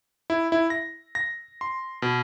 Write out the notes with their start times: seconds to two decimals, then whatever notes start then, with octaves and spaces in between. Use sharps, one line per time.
0.30 E4
0.52 E4
0.70 A#6
1.15 A#6
1.61 C6
2.02 B2